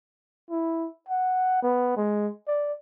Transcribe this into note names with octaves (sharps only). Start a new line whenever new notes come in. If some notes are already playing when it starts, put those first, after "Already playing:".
E4
F#5
B3
G#3
D5